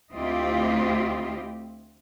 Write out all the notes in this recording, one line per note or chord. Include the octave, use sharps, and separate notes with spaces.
D2 C4 E4 F4 G4 D#5